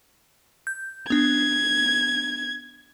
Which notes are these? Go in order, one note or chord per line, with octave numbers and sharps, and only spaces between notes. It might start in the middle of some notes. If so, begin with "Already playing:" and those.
G6
B3 D4 G#6